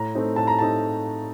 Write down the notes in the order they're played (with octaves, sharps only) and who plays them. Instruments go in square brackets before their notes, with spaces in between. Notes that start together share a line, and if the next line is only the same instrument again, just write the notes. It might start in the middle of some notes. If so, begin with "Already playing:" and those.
Already playing: [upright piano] A2 A#5
A3 C4 D#4
A2 A5
A#5
A3 C4 D#4 A5